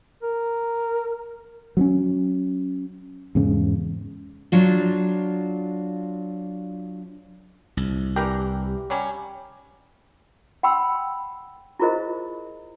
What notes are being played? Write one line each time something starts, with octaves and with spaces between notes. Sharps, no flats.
A#4
F#3 C4 C#4
E2 G#2 C#3
F#3 D4 F4
C2
E3 D4 G4 A#4
F#3 G3 C#4
F#5 G5 B5 C6 E6
E4 F4 G#4 A#4 C5 D#5